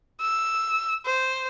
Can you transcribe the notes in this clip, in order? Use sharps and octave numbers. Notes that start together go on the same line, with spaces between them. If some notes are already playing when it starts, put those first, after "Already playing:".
E6
C5